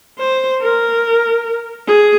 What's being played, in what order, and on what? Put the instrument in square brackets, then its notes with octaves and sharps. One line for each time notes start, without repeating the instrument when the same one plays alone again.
[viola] C5
A#4
G#4